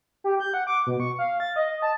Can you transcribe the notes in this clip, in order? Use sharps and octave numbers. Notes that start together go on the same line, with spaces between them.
G4
G6
F#5
D6
B2
C#6
F5
A6
D#5
A5